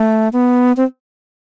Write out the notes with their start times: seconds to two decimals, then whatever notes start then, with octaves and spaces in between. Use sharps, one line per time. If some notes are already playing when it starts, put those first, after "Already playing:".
Already playing: A3
0.33 B3
0.77 C4